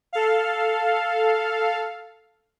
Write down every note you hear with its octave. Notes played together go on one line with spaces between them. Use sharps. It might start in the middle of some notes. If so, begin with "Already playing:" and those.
A4 F5